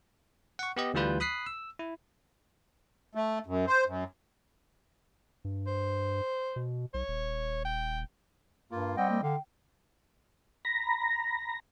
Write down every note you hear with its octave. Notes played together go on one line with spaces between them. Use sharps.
F#5 C#6
B3 G4 D#5
D2 E3 G3 F4 B4 G6
B5 D#6 F#6 B6 C7
E6
E4
A3
F#2
C5
F#2
G2
C5
B2
B1 C#5
D#1
G5
G2 A#3 F4
G3 C4 D#5 F#5 G5
A#3
D3 F5 G5
A#5 B5 A#6